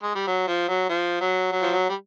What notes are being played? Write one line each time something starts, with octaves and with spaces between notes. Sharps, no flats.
G#3
G3
F#3
F3
F#3
F3
F#3
F#3
F3
F#3
G3